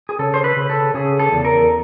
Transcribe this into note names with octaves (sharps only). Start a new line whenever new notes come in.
G#4
C#3 A4
C5
B4
C#3
A4
C#3 G#4
A4
E2
A#4